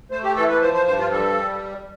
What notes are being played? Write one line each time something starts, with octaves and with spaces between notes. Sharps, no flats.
A3 C5
G4
E3 A4
B4
F3 C5
C5
G2 C5
F4
G3 A4